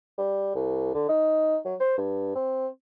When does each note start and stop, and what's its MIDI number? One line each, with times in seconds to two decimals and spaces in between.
0.18 0.52 55
0.55 0.93 36
0.94 1.08 50
1.09 1.57 63
1.65 1.75 54
1.80 1.96 72
1.98 2.33 43
2.35 2.68 60